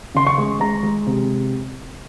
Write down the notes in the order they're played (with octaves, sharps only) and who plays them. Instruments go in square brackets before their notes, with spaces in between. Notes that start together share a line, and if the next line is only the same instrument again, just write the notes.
[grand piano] C#3 C6
C#6
G#3
G#3 A#5
G#3
C3